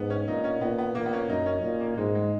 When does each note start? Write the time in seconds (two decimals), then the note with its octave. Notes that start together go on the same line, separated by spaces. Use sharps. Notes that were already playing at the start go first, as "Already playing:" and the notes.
Already playing: G#2 B3
0.10 C#4
0.28 A#2 D#4
0.44 C#4
0.61 A#2 B3
0.78 B3
0.95 A#2 A#3
1.06 B3
1.13 C#4
1.29 F#2 D#4
1.46 C#4
1.63 A#2
1.80 A#3
1.97 G#2 G#3
2.15 G#3